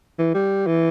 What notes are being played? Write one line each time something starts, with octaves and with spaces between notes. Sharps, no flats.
E3
G3
E3